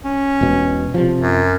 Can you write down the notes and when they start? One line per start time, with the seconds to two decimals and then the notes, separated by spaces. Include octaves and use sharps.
0.05 C#4
0.41 E1 B2
0.94 C3 F3
1.19 F#2